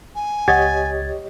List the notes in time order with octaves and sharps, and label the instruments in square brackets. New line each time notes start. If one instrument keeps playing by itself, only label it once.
[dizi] G#5
[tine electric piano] C#2 G#6 A6 [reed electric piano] G4 C#5 D#5 [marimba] F#5